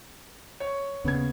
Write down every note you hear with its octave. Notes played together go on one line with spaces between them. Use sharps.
C#5
D#2 C#3 B3 G#6